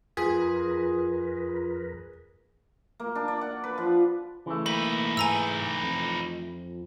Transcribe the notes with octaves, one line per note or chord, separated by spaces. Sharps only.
F2 F4 G#4 A#4 B4
A#3
D4
D5
F#5
B4
F3
C#3 E3 A3
A#3 D#4 B4 B5
G#2 G#5 A#5 E6
F2